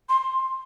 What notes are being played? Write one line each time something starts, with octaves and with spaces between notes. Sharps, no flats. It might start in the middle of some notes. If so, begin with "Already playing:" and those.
C6